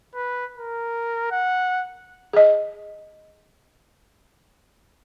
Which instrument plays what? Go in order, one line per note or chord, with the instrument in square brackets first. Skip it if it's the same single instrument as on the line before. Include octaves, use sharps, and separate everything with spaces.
[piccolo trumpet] B4
A#4
F#5
[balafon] G#4 D#5